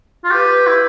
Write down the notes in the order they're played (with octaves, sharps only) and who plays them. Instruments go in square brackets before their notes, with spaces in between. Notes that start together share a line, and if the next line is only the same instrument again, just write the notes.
[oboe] F4
[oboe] G4 [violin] B4
[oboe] E4